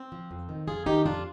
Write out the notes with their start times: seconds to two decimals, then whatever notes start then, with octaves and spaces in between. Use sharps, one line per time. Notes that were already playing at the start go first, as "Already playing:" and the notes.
Already playing: C4
0.12 F3
0.31 F2
0.49 D#3
0.68 F2 F4 G#4
0.86 D#3 D#4 G4
1.05 F2 D4 F4